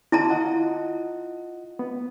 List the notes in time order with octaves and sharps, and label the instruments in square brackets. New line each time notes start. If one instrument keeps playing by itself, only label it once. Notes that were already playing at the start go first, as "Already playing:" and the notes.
[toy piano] E4 A5 A#5
[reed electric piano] F4 D#5 F#5
B3